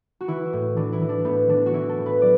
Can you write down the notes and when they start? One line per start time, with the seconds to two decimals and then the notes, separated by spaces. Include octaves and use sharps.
0.21 F#4
0.28 E3 E4
0.53 A2
0.77 E3 D4
0.93 E4
1.01 E3
1.09 D4
1.25 A2 B3
1.49 E3 D4
1.66 F#4
1.74 E3 E4
1.89 A4
1.98 A2
2.06 B4
2.22 F#3 D5